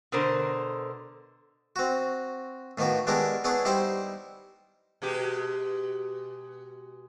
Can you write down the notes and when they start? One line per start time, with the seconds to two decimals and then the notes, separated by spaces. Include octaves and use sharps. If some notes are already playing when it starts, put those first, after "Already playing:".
0.12 B2 D3 A#4 C5
1.76 C4 F#4
2.78 A2 D#3 A#3 B3 F#4
3.07 G#3 B3 D4 E4 G4 A#4
3.44 B3 D4 E4 G#4 C#5
3.65 G3 D#4 E4 G4 C5
5.02 B2 G#3 G4